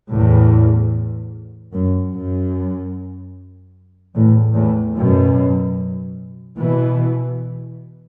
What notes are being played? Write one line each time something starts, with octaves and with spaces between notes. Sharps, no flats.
E2 A2
F#2
F#2
E2 A2
E2 A2
F#2 B2
B2 E3